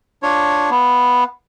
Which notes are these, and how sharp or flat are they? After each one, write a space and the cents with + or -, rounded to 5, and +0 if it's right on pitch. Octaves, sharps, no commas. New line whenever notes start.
D4 +0 F4 +0 C#5 +0
B3 +0 F5 +0